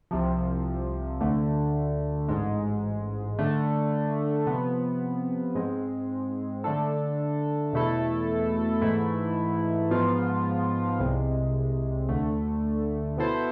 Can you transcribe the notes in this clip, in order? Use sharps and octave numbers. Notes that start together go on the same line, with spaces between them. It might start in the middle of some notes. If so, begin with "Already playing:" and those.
C2 C3 F3
D2 D3 A3
A1 G#2 G#3
D3 A3 D4 A4
C3 F3 B3
G#2 G#3 C4
D3 A3 D4 A4
E2 B2 A3 E4 A4
G#2 E3 A3 E4
G#2 F3 B3 F4
C2 C3 G#3
D2 D3 A3
B2 B3 E4 A4 C5